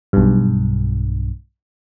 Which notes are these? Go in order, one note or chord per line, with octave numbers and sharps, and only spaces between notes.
B1 G2